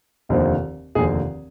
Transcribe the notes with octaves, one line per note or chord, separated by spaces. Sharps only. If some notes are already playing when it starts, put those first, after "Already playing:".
F1 D#2 D3 F3 C4
F1 D#2 D3 F3 C4 G#4